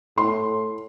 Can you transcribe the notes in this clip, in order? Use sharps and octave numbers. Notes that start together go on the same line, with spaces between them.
A2 C6